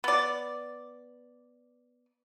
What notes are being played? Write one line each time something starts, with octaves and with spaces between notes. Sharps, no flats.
B3 D5